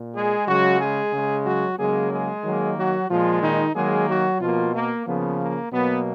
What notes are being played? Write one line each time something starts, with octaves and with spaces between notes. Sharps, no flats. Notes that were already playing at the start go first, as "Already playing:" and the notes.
Already playing: A#2
G#3 G#4
C#3 F#3 G#3 F#4
G#3 G#4
C#3 G#3
F#3 F#4
C#3 F#3 G#3 A#3 G#4
G#3 G#4
D#3 F#3 A#3
F#3 F#4
A#2 F3 G#3 F4
D#3 D#4
D#3 F#3 G#3 A#3 G#4
F#3 F#4
B2 F3 A#3 F4
A#3
C#3 F3 A#3 B3
A#3
B2 F#3 A#3 B3